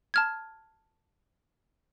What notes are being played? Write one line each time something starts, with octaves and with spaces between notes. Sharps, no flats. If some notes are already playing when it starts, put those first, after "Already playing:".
A5 F6 G#6